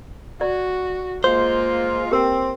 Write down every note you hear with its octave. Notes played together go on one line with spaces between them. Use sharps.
F#4 D5
G#3 A#3 F4 C5
C4 G4 A#4